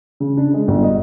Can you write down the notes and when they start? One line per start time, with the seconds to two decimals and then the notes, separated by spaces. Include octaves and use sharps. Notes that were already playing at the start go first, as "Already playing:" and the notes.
0.20 C#3
0.37 D4
0.54 G#3
0.68 G1
0.83 D#5